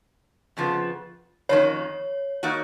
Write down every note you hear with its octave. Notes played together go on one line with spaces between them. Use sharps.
F2 C#3 F3 B3
F2 D#3 F#3 A#3 C#4 C#5
D#3 A#3 D#4 F#4